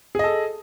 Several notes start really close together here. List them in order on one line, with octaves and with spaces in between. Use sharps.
G#4 D#5 A4